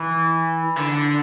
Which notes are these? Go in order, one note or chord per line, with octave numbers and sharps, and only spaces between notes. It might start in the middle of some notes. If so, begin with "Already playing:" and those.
Already playing: E3
D3